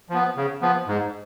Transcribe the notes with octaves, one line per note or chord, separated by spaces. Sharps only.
F3 B3
C#3
F3 B3
G#2